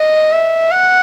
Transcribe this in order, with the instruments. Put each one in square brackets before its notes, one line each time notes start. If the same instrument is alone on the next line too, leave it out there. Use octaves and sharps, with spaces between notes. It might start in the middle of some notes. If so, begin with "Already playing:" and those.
Already playing: [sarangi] D#5
E5
F#5